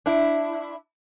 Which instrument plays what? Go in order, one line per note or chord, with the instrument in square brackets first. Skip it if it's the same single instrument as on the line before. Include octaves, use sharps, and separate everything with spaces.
[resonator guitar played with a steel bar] D4 E4